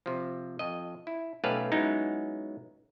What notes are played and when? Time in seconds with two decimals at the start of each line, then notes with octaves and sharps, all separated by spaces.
0.06 C3 F3
0.59 F2 D#5
1.07 E4
1.44 B1 A3 C#4 G4 B4 F5
1.72 F#3 G#3 B3 C#4 D#4 E4